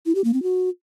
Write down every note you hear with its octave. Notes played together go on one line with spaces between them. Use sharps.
E4
G4
A#3
C4
F#4